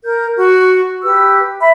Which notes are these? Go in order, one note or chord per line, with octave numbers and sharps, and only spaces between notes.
A#4 G6
F#4
G4 B4 E6
E5 B5